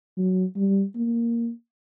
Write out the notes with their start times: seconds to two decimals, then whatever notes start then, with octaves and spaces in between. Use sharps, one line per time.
0.17 F#3
0.56 G3
0.95 A#3